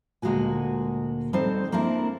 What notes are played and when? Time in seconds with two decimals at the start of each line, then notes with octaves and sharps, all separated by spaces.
0.22 D2 A#2 G#3 A#3 F#4 G#5
1.33 G3 C4 D#4 A4 C5
1.72 A#3 C4 D4 E4 A#4 A5